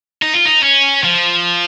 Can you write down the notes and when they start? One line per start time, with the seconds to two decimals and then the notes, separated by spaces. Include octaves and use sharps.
0.22 D#4
0.34 F4
0.46 D#4
0.63 C#4
1.04 F3